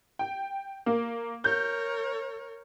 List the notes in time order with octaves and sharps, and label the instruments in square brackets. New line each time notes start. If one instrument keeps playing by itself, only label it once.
[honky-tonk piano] G5
A#3
[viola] A#4 C#5 [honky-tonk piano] G6